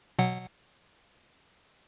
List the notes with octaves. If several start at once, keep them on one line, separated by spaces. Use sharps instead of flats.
B2 F#3 F#5